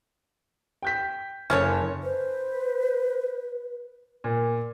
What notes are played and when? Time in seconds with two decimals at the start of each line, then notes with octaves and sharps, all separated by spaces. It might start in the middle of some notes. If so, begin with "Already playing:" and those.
0.82 G5 G6 B6
1.50 F#1 C#4 A4 C#5
2.03 B4 C5
4.24 A#2